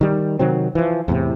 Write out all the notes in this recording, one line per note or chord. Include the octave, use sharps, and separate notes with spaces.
D#3 G3
C3 D#3 F#3 C4
E3 F3
E2 A2 C3